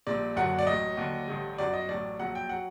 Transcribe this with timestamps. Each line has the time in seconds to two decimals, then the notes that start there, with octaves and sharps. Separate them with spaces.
0.07 A#1 A#2 G3 D5
0.36 F#1 F#2 D3 F#3 F#5
0.59 D5
0.67 A1 A2 F#3 D#5
0.97 D#2 D3 F#3
1.28 A1 G2 D3 G3
1.58 G1 F#2 F#3 D5
1.74 D#5
1.88 A1 A2 F#3 D5
2.19 A#1 A#2 F#3 F#5
2.35 G5
2.49 F#3 F#5